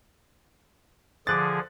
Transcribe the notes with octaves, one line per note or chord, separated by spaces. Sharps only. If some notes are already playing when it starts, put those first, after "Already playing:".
D3 F3 G#4 D6 F#6 A6